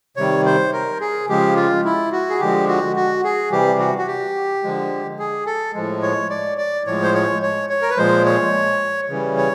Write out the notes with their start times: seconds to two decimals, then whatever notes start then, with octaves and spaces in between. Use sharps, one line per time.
0.17 C3 D#3 G3 C#5
0.46 C5
0.73 A#4
1.01 G#4
1.28 C#3 F3 G#3 G4
1.56 F4
1.84 E4
2.12 F#4
2.30 G#4
2.40 D3 F3 G#3 G4
2.68 F#4
2.96 F#4
3.24 G#4
3.52 C3 E3 G3 G4
3.80 F#4
3.98 F#4
4.07 G4
4.64 D3 F3 G#3
5.19 G#4
5.47 A4
5.74 A2 F3 G#3
6.03 C#5
6.30 D5
6.58 D5
6.86 A2 F3 G#3 C#5
7.03 C5
7.14 C#5
7.42 C#5
7.70 C#5
7.82 A#4
7.90 B4
7.98 A#2 F3 G#3 C5
8.25 C#5
9.09 C#3 E3 G3
9.37 C#5